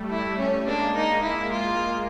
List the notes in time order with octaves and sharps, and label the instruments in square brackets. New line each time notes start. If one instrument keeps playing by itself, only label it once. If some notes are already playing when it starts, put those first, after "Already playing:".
Already playing: [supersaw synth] G3 A3
[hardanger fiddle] E4
C#4
[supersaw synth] G#3 A#3 [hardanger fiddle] D4
[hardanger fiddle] D#4
E4
F4